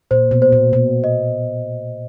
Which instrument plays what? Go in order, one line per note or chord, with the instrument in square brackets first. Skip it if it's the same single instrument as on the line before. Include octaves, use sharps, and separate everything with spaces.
[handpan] A#2 [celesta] C5
[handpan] B2
[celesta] C5
[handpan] A#2
[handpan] B2 [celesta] C5
[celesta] D#5